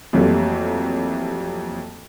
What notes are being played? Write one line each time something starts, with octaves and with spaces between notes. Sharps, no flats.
F2 E3 F#3 G3 A3 A#3